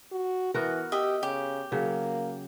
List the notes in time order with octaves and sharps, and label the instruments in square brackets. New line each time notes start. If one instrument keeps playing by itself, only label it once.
[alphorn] F#4
[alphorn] E3 [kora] B3 F#4 A#4
[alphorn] G4 [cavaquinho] D#5 E5
[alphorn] C#3 [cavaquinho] G4
[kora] C#3 F#3 [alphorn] A#3